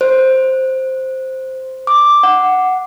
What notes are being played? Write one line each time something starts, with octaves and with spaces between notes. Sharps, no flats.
C5
D6
F#5